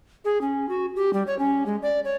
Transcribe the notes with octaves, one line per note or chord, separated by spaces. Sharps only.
G#4
C#4
F#4
G4
G3
C#5
C#4
G#3
D5
C#5